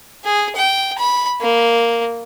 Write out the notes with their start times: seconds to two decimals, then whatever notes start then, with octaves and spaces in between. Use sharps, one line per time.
0.24 G#4
0.56 G5
0.98 B5
1.41 A#3